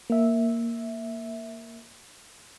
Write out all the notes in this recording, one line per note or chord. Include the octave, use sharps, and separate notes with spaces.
A#3 E5